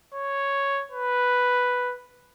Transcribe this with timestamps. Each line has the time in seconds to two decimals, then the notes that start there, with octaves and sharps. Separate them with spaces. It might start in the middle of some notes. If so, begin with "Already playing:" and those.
0.15 C#5
0.92 B4